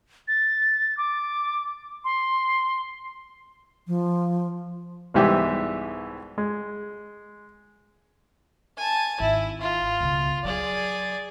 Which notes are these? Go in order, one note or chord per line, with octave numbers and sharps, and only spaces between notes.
A6
D6
C6
F3
C2 G#2 B2 E3 G4 E5
G#3
G#5 A5
G#1 E4
F4
C#2 B2
F#3 G#4 D5